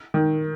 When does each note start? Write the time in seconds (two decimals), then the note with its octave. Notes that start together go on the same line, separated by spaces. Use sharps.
0.14 D#3